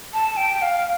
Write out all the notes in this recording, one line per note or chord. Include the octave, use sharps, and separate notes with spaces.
A5
G5
F5